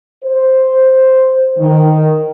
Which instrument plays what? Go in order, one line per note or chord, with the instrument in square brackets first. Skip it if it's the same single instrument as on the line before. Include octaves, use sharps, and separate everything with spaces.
[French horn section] C5
D#3